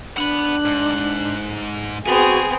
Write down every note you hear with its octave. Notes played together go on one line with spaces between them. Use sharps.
D4 F#5 B5 F#6
G#2
B3 C4 F#4 G#4 G#5